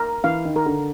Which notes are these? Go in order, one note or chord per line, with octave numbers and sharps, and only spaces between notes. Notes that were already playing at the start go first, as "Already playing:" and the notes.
Already playing: A#4
E3 F5
D#3
A#4
D3